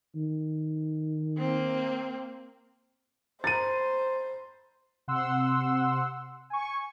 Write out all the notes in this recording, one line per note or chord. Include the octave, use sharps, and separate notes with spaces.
D#3
A#3 C4
C5 A#5 B5 A6 D#7
C3 F#5 C6 E6
G#5 C#6